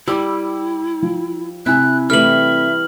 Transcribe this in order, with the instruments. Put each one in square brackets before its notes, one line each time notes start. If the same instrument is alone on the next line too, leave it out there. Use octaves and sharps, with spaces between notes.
[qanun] G3 [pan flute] E4 [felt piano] D6 E6
[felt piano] F3
[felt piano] C3 G#5 [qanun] E4 [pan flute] F#6
[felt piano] C3 A3 [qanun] E3 G3 [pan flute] E5 [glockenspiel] F6 F#7